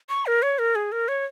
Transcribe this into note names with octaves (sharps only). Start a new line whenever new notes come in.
C#6
A#4
C#5
A#4
G#4
A#4
C#5